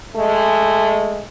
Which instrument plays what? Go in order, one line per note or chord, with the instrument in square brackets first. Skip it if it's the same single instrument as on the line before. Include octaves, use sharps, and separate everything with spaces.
[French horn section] G#3 A3